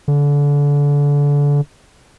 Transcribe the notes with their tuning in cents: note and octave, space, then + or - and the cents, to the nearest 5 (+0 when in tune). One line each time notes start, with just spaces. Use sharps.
D3 -30